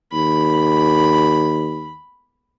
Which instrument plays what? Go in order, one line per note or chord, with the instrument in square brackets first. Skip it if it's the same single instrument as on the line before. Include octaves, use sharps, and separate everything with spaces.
[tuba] D#2 [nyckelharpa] B5